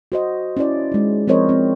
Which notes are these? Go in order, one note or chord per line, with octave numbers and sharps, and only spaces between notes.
F#4 C5 D#5
C#4 E4 D5
G#3 D#4
F3 C4 A#4 C5 C#5 D#5
C4